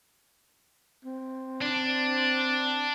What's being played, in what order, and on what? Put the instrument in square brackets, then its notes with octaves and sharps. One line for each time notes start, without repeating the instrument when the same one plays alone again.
[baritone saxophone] C4
[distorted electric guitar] D4